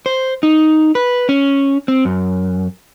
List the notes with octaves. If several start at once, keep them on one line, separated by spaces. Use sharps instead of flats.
C5
D#4
B4
C#4
C4
F#2